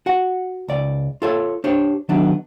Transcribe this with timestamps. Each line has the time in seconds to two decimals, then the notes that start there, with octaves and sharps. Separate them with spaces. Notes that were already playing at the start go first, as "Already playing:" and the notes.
0.06 F#4 F#5
0.68 C#2 D5
1.22 F4 A4 C#5
1.64 D4 G4 C5 C#5
2.09 D#3 F#3 A3 B3 D4